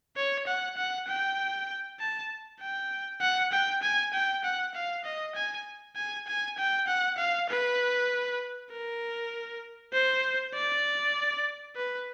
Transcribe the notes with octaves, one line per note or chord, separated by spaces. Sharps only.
C#5
F#5
F#5
G5
A5
G5
F#5
G5
G#5
G5
F#5
F5
D#5
G#5
G#5
G#5
G5
F#5
F5
B4
A#4
C5
D5
B4